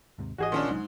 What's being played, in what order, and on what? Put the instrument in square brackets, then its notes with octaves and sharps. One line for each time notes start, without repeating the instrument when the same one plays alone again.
[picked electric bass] D#2 G#2 C3
[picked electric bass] G#1 E3 [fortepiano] F#4 G#4 D#5
[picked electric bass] A#1 D#3 A#3 [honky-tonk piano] A#2 C#4 D4
[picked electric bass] C2 F#3 [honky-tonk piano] G#2